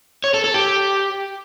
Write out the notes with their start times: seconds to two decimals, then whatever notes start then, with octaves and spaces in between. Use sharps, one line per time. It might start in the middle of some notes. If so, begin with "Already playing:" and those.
0.24 C#5
0.34 A4
0.44 A4
0.54 G4